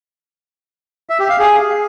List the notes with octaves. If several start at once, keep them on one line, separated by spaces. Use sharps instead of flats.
E5
G4
F5
G#4